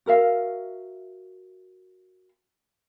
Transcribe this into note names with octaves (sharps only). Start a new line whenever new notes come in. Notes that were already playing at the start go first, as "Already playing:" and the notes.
F#4 A#4 E5 F5